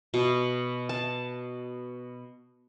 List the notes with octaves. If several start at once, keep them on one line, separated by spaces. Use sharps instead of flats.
B2
A5